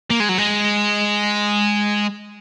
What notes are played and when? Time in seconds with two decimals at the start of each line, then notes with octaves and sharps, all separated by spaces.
0.11 A#3
0.20 G#3
0.29 F#3
0.38 G#3